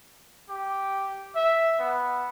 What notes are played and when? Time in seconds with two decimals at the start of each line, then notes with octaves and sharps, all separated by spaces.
0.49 G4
1.35 E5
1.79 B3